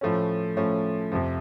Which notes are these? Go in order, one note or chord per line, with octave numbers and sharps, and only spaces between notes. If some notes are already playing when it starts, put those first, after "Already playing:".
A2 F3 A3 C#4
A2 F3 A3 C#4
F2 C3 F3